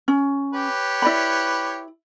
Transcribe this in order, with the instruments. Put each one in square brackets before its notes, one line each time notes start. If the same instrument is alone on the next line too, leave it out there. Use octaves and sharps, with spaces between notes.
[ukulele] C#4
[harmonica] G4 B4 C#5
[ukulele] E4 D5 B5